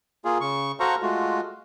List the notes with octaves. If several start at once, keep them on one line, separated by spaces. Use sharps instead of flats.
A#3 F4 G#4
C#3 C#6
F#4 A4 C5 F5 A#5 C#6
G#3 A3 F4 F#4